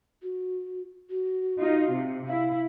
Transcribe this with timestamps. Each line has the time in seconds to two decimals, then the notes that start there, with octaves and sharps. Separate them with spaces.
0.23 F#4
1.10 F#4
1.58 D#4 F4
1.91 C3
2.27 E4 F5